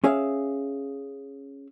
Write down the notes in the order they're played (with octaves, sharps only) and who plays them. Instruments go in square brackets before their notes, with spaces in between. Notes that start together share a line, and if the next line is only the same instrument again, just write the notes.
[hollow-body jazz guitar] C#4 G#4 E5 F5